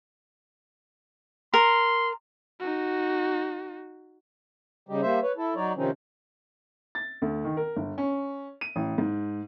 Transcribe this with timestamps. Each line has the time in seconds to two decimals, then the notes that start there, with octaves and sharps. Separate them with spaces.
1.54 A#4 C6
2.60 D#4 F#4
4.89 C#3 G3 D#4 G4
5.02 G3 A#3 C5 E5
5.22 B4 C#5
5.37 E4 A4
5.56 F#3 D#4 C#5 D5
5.76 C3 D#3 F3 C4 C#4 D#4
6.95 A6
7.22 D2
7.45 D#3
7.57 A#4
7.77 G1
7.98 C#4
8.61 D#7
8.76 A1
8.98 G#2